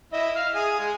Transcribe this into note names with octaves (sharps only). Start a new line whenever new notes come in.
E4 D#5 E5
F5 F6
G#4 G#5
G#3